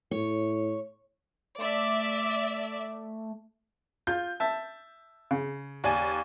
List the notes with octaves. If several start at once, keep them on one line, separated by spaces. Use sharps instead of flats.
A2 C#5
A3 D5 E5
F4 G6
E5 A5
C#3
D#2 D5 G#5